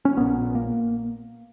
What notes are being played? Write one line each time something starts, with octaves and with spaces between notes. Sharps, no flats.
C#4
A#1 A#2 B3
A#3